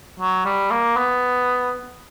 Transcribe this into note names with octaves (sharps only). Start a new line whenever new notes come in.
F#3
G3
A#3
B3